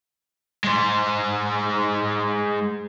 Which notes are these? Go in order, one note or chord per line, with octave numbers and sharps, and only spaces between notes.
G#3 C5